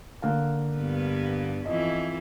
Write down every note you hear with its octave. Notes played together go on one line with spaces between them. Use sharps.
D3 A#3 F5
G2 B3
F2 E3 D#5